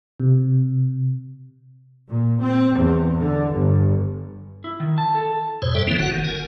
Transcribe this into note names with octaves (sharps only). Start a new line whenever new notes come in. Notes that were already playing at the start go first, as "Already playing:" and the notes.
C3
A#2
C4
E2
D3
G1
E4
D#3
A5
A4
E2 G#2 B2 C5 C#5
F#2 G3 A4 E5 G5
D3 E3 F3 A#3 C4 E4
F#1 D3 F#4 F#5
D#3
A#4 G#5